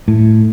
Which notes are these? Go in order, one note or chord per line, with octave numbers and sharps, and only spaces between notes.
A2